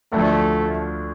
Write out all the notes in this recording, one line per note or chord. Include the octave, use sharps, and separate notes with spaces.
D2 D3 F3 A3